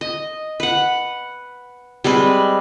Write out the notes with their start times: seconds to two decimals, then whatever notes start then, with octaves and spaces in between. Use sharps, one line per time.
0.01 D#5
0.60 B4 F#5
2.04 G3 G#3 C4 B4